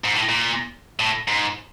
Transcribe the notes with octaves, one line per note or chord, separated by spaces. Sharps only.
G#2
A2
A#2
A2
G#2